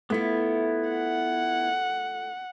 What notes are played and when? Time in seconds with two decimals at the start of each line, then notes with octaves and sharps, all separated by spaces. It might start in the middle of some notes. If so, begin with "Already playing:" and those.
0.10 A3 B3 E4 F4
0.89 F#5